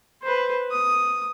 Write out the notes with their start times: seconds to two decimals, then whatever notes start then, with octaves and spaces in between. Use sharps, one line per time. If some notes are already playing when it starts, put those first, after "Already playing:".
0.23 B4 C5
0.71 D#6